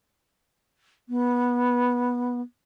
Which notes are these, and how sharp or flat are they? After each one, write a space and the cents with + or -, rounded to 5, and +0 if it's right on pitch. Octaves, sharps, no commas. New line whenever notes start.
B3 -15